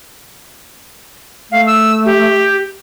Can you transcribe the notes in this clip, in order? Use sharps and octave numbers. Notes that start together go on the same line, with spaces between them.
A3 F5
E6
G4